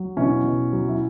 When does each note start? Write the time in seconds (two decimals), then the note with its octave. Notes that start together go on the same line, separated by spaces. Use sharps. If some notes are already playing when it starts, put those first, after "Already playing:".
Already playing: F#3
0.17 B2 C#4 E4
0.44 B2
0.73 F#3
0.89 E4